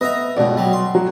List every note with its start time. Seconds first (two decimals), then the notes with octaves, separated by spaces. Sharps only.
0.01 B3 D#5 E5 A#5
0.37 C#2 G2 B2 D5
0.57 F#3 G3
0.73 C6
0.95 F#3